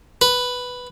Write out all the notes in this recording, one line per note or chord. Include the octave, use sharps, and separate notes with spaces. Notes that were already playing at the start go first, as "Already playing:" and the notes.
B4